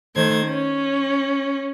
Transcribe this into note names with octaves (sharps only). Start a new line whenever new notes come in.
D#3 A3 C5 G#6
C#4